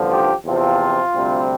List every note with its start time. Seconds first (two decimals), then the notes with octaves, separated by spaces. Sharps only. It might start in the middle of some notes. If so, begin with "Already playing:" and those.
Already playing: A1 G2 D3 F3
0.11 G4
0.45 E2 C3 F3 C4 F4
1.14 D2 C3 G3 C4